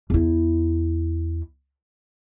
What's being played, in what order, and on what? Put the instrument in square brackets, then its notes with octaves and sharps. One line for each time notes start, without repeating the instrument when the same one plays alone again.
[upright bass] E2 E4